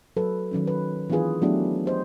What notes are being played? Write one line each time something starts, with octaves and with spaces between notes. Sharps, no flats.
F#3 A4 B4
D#3 F#3 C#4 D#4
B4
E3 B3 D4 F4 G#4 B4
F#3 A3 B3 D4 E4 G4
G4 C5 D#5